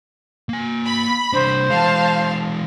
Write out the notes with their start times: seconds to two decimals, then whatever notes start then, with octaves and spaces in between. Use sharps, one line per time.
0.49 A#3 G#5
0.86 B5
1.33 C2 D4 C5
1.70 E3 G#3 F5 A5